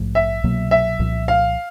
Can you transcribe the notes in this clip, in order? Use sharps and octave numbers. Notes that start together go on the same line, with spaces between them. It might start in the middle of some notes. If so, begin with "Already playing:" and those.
Already playing: A#1 G#2 F3 A3
E5
C2 B2 F#3 A#3
E5
C2 A#2 F3
F5